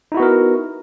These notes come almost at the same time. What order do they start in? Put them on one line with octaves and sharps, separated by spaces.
D#4 E4 F#4 B3 A#4